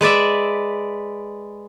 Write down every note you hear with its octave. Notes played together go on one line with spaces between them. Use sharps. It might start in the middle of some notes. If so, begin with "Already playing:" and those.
G#3 B4 D5 E5